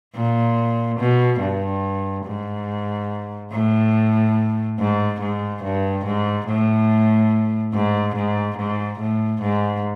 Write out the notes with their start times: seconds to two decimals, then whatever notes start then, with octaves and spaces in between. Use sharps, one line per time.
0.15 A#2
0.99 B2
1.41 G2
2.26 G#2
3.52 A2
4.78 G#2
5.20 G#2
5.63 G2
6.05 G#2
6.47 A2
7.73 G#2
8.15 G#2
8.57 G#2
8.99 A2
9.42 G#2